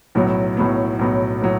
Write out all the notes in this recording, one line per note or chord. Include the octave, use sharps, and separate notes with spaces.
B1 A2 F#3 B3
B1 A2 F#3 B3
B1 A2 F#3 B3
A2 F#3